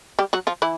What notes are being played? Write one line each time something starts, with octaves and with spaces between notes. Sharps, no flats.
G3 G4
F#3 F#4
F3 F4
E3 E4